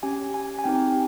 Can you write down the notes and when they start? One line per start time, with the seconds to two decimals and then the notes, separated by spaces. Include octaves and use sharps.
0.03 C#4 G4 G#5
0.34 G#5
0.59 G#5
0.64 C4 D#4 G4 G5